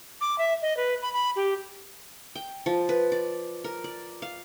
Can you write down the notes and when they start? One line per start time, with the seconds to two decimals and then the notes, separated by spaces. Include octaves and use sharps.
0.21 D6
0.38 E5
0.62 D#5
0.77 B4
1.02 B5
1.13 B5
1.36 G4
2.35 G5
2.66 F3
2.89 B4
3.12 D5
3.64 A#4
3.84 D5
4.22 F5